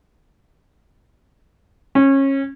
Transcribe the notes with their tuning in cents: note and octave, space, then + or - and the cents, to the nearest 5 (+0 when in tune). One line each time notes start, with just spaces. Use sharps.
C#4 -25